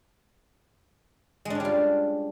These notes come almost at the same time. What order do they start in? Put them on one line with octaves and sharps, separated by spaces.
G#3 D4 C#4 G3 F4